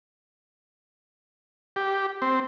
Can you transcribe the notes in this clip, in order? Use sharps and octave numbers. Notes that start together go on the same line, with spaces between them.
G4
C4